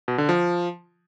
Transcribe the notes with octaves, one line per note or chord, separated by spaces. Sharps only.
B2
D3
F3